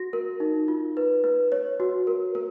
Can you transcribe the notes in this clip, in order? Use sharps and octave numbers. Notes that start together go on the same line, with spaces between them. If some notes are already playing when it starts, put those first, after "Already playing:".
Already playing: F#4 A#6
A#4
D#4
F4
B4
B4
C#5
F#4
A#4
A#4